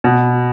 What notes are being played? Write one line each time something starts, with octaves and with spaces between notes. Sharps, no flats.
B2